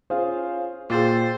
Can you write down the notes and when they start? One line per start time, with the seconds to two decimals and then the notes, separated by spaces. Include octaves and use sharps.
0.10 C#4 F4 G#4 C5 F5
0.90 A#2 F4 G#4 C5 F5 G5 E6 A6